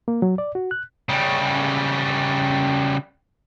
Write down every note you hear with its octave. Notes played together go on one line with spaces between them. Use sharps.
A#3
F#3
D5
F#4
F#6
C#3 G3